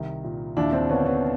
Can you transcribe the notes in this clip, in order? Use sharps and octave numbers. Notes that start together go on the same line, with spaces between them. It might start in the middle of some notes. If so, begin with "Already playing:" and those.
Already playing: C2 D#3
A#2
D#2 D4 E4
C4 D4
D3 B3 C#4
B3 C#4